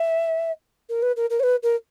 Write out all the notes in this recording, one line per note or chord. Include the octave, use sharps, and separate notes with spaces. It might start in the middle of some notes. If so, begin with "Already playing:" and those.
Already playing: E5
A#4
B4
A#4
A#4
C#5
B4
A#4